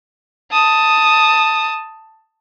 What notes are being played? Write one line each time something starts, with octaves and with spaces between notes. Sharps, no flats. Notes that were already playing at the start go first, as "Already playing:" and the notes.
A5 D#6